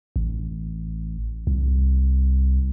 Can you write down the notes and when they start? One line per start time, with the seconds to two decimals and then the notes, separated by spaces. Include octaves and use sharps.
0.16 A1
1.47 C2